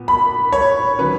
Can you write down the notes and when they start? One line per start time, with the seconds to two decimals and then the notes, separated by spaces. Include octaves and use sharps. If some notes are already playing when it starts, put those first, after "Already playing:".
Already playing: A#2 B3
0.08 B5
0.53 C#5
0.99 D#3 F#3 C#4 B4